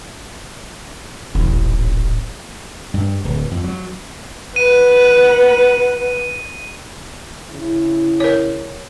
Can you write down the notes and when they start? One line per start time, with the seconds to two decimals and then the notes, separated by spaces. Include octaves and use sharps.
1.35 D#1 A1
2.94 G2
3.25 D1
3.51 F2
3.64 F#3
4.56 B4 F#5 D#7
7.50 C#3 E4
8.20 A#4 C#5